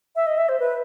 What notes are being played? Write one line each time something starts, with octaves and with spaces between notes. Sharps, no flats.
E5
D#5
E5
C5
B4